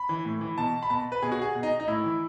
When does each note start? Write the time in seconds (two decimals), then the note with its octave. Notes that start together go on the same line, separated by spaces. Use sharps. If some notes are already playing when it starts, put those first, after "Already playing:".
Already playing: B5
0.09 E3
0.25 A2
0.41 E3
0.58 B2 A5
0.83 B5
0.90 B2 A5
1.12 B4
1.22 B2 G#4
1.32 F#4
1.42 G#4
1.55 B2
1.63 D#4
1.80 D#4
1.87 A2 E4
2.04 E3